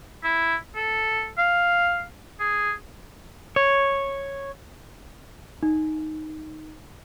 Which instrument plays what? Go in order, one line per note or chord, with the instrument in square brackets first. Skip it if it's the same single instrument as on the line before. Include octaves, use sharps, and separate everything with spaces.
[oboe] E4
A4
F5
G#4
[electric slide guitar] C#5
[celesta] D#4